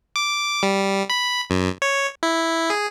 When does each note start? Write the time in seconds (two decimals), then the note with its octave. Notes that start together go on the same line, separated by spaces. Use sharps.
0.16 D6
0.63 G3
1.10 B5
1.50 F#2
1.82 C#5
2.23 E4
2.70 G#4